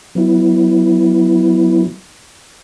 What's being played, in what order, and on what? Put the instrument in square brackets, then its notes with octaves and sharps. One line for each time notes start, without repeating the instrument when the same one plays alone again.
[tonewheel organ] F#3 B3 E4